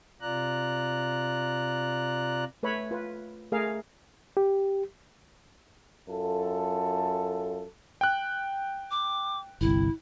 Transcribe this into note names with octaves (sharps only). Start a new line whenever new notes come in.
C3 F4 D5 A#5 F#6
A3 B4 C#5 E5 B5
F4 B4
A3 G#4 A#4 F5
G4
F#2 F4 A4
G5 F#6
D6
G1 C2 E4